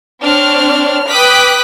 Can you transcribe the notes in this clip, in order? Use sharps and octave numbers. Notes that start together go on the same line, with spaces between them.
C4 D4 C#5 F6
B4 G5 D6 D#6 F#6 B6